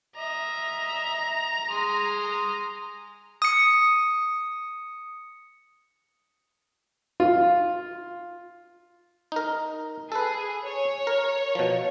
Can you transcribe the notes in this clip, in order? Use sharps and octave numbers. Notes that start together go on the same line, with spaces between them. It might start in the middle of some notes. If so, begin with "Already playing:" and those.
D#5 E5 A#5
G#4 C6 D#6
D#6 C#7
F4
D#4 A#4
G#4 A4 B4
C#5
A#4
B2 F3